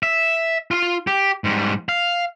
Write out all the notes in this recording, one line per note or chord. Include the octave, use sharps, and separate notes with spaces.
E5
F4 F5
G4
G#2 G3
F5